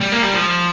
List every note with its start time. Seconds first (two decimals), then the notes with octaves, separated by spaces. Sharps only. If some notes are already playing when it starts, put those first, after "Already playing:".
0.01 G3
0.12 A#3
0.23 G3
0.34 F3